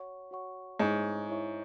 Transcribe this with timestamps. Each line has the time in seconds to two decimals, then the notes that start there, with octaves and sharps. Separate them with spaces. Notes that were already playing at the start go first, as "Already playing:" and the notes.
Already playing: F#4 C#5 F#5 C#6
0.31 F#4 C#5 F#5 C#6
0.79 G#2 E4 C#5 E5 C#6
1.29 E4 C#5 E5 C#6